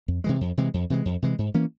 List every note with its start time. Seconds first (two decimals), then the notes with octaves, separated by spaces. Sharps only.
0.08 F2
0.24 C3 E3 G#3
0.41 F2
0.57 C3 E3 G#3
0.74 F2
0.90 C3 E3 G#3
1.05 F2
1.22 C3 E3 G#3
1.38 G#2
1.54 E3 A#3 C#4